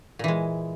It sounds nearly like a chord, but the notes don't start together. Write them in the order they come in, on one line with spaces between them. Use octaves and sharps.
A#2 E3 G#3